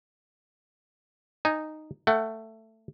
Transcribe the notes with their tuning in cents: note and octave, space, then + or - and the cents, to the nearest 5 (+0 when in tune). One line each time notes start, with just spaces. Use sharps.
D#4 -10 G#5 +0
A3 +15 F#5 +30